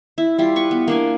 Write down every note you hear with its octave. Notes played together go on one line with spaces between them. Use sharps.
E4
G3 E4 F4
B4 C#6
B3
A#3 D4 G#5